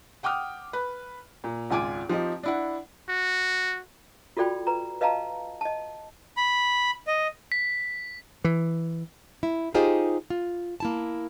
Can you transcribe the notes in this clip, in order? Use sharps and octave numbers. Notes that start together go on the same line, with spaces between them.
F#5 G5 D6 D#6 F6
B4
A#2
G#1 C#2 F4 G#5 D6 D7
F3 C4 D#4 G4
D4 E4 F#5
F#4
F4 F#4 A4 D5 G5 B5
B4 A#5
B4 D#5 F5 A5 A#5
D#5 A5
B5
D#5
B6
E3
E4
D#4 F4 G4 G#4 C5 D#5
F4
A#3 E4 A5